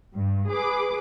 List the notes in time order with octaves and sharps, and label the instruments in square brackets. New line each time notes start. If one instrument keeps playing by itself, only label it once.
[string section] G2
G#4 B4 D6